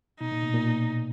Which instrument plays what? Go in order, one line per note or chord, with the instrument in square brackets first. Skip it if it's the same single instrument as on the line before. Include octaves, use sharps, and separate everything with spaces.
[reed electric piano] B2 [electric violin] D#4
[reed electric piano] A#2
B2
A#2